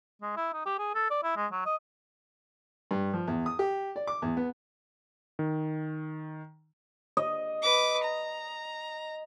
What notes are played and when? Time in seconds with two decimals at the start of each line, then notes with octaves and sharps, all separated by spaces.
0.22 G#3
0.37 E4
0.54 D#4
0.66 G4
0.79 G#4
0.95 A4
1.10 D5
1.23 E4
1.36 G#3
1.52 F#3
1.66 D#5
2.91 G2
3.13 F3
3.27 E2
3.46 D#6
3.59 G4
3.96 D5
4.07 D6
4.22 E2
4.37 B3
5.39 D#3
7.17 D#5
7.62 B4 D6
8.04 A#5